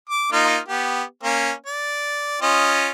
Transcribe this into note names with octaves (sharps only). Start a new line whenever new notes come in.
D6
A#3 D#4 F4
B3 G4
A#3 C#4
D5
C#4 F4 D#5